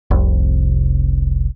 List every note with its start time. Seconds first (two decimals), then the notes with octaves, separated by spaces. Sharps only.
0.11 F1 C2